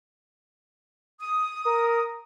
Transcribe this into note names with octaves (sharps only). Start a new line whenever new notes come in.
D#6
A#4